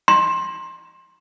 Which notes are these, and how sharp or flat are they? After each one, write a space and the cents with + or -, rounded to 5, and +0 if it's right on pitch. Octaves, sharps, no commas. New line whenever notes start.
C6 +20